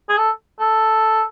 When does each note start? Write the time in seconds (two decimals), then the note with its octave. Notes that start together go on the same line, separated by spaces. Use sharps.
0.09 G#4
0.17 A4
0.60 A4